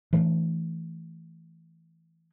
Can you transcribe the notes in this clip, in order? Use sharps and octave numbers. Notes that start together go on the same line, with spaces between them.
E3 A3 D4